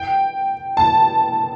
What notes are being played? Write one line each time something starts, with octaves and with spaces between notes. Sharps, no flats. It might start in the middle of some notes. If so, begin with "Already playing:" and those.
Already playing: G5
A5